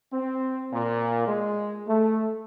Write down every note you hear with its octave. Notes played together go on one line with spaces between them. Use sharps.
C4
A#2
G#3
A3